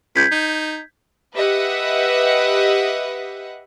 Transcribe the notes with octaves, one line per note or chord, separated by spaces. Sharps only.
C#2 G6 G#6 B6
D#4
G4 B4 D#5 E5 F#5